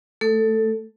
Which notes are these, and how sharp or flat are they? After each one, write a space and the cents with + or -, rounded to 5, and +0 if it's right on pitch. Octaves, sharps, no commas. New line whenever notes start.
A3 +0 A4 +10